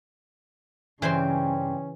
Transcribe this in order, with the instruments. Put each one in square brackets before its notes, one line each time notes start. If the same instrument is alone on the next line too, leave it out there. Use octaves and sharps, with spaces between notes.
[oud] G2 C4 [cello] C#3 [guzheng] E3 C5 C6 [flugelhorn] C#4